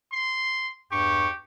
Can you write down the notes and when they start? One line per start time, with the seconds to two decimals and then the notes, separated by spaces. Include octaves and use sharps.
0.12 C6
0.92 E2 G2 G4 C#6